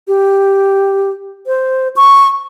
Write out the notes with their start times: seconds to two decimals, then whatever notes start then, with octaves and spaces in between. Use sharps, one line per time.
0.08 G4
1.47 C5
1.96 C#6